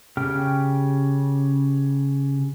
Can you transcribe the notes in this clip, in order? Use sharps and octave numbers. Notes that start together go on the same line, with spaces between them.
C#3 G4 G5 F6